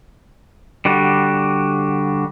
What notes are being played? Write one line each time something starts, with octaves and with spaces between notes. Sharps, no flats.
D3 G3 F#4